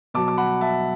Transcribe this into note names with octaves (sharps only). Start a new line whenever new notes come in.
B2 F#3 A5 D6
D6
F#5 B5
E5 A5